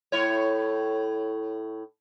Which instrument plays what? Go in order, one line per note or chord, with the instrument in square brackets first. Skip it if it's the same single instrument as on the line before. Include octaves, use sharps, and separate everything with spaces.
[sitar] A2 E4 C#5